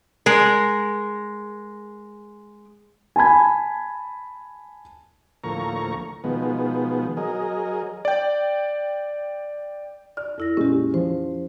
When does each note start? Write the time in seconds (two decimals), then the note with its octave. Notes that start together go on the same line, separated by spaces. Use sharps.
0.26 G#3 A#4
3.16 G#5 A5 B5 G#6
5.44 D2 A2 F3 A#3 A#5 C#6
6.24 B2 D#3 F3 G#3 B3
7.17 F#3 G#4 A#4 D#5
8.05 D5 G5
10.17 D5 F6
10.38 F2 E4 A4 A#6
10.57 A#2 G#3 C#4 G4
10.94 F3 C5